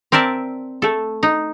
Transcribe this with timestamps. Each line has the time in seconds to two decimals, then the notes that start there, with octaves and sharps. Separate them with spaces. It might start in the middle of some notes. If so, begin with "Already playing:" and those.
0.12 C4 A#4 D5 E5 A5
0.82 A3 A4
1.23 D#4